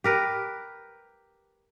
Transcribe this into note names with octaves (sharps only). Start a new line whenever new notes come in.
G4 A#4 B4